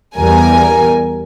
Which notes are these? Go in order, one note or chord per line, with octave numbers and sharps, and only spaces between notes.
E2 G3 A#4 G#5